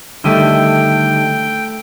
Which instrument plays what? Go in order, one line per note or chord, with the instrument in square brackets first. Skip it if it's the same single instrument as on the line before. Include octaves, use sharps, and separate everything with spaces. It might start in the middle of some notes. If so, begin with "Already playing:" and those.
[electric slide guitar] D3 D#3 G3 [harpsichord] A3 E4 [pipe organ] G5